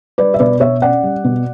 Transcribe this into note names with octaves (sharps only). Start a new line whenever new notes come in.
G3 B4 D5
E5
B2 B4 D5
B2 C#5 E5
C#4 D5 F#5
G3
B2